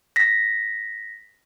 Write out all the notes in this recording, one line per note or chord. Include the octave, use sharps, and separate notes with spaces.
A#6 B6